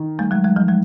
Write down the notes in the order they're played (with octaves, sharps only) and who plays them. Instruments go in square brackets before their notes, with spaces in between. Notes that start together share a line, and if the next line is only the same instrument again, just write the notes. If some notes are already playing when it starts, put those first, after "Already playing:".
Already playing: [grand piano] D#3
[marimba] G3 A3
F#3 G#3
F#3 G#3
F3 G3
F#3 G#3